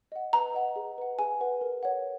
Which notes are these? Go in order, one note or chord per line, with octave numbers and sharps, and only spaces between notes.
D#5 F#5
B4 A#5
D#5 F#5
G#4
B4 F#5
G#4 G#5
B4 F#5
A#4
C#5 F#5